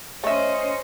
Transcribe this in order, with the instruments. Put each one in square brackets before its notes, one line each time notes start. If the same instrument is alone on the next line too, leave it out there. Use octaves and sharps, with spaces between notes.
[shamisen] A3 E5 [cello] C#4 C5 [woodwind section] D#5